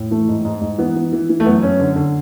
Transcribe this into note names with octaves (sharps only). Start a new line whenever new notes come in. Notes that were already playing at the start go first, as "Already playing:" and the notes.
Already playing: A2
E3 A3
G#2
G#2
G#2
E3 B3
E3
E3
E3
A3
F#2 B3
F#2 C#4
D3
D3